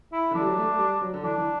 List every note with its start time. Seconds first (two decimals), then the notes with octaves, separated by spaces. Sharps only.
0.13 E4
0.31 D3
0.35 E3 D4
0.41 G3
0.46 F#3
0.58 A3
0.68 A3
0.79 G3
1.01 F#3
1.14 D3
1.23 E3 D4
1.38 E3